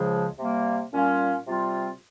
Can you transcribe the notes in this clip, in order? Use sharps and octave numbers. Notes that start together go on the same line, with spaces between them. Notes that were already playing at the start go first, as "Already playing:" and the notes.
Already playing: C#2 C#3 F3 G#3
C3 G3 A#3
A#2 G3 C#4 F4
C3 G3 C4 F4